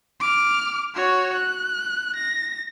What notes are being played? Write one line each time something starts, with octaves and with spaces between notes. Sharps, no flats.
D6 F6
F#4 C#5
F#6
A#6